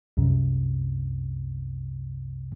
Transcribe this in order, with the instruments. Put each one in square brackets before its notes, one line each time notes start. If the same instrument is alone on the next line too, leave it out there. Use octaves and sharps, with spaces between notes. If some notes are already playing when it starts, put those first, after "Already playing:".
[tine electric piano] C2 F#2 C3